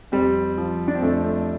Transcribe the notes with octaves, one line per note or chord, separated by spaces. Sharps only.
F2 G3 C4
F3
D4
C4
F2 A3
A3